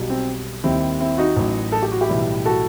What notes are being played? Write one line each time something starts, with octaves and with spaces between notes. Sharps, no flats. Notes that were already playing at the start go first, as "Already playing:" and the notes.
Already playing: B1 B2 G3
C4
D#2 D#3 G3 C4 E4
C4 E4
D#4 F#4
A1 A2 F#3
A4
G4
F#4
E4 G4
B1 A2 E3 G3
F#4 A4